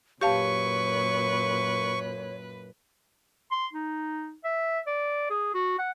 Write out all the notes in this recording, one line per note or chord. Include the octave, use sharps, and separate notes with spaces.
F#2 A#2 G4 B4 C#5 F5 A5 C#6
C6
D#4
E5
D5
G#4
F#4
F#5